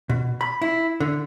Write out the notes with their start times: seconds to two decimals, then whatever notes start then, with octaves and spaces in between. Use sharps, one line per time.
0.10 B2
0.41 B5
0.62 E4
1.00 D3